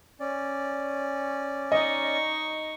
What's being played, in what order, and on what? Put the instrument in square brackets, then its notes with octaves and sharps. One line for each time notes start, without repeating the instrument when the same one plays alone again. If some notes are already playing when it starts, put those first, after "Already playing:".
[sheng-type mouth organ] C#4 D5
[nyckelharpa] D#4 C#6 [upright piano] D#5